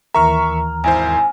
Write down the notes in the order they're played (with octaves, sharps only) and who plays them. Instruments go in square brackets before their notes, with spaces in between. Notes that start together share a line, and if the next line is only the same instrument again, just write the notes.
[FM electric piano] D#2 E3 A#4 [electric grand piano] E5 C#6 F6 [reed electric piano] A#5
[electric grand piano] G#1 E4 C5 [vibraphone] G#5